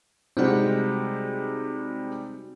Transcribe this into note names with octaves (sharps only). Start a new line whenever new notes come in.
C3 G3 G#3 C4 D#4 F#4